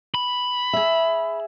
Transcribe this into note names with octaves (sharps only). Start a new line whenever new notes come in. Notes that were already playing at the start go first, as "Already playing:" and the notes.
B5
G#4 E5